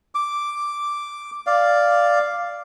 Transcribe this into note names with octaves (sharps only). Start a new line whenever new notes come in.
D6
D5 F5